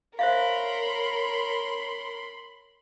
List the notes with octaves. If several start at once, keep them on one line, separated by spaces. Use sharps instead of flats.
A#4 C5 C#5 E5 F5 B5 C6